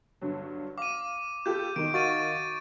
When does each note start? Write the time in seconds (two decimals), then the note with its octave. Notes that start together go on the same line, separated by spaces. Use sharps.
0.21 G2 D3 F#3
0.78 F5 D6 D#7
1.46 F4 G4 A4 G6
1.76 D#3 D#4 D7
1.94 F#4 D#5 F5 C#6 A6 D#7